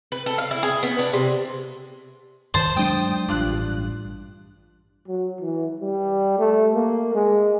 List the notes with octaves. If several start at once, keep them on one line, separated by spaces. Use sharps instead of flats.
B4
A4
F5
E4
G#4
B3
D4
C3
G2 D#3 C5 A5
F#3 G#3 D4 G5 D#6
A1 G2 D4 F4 F#6
F#3
E3
G3
A3
A#3
G#3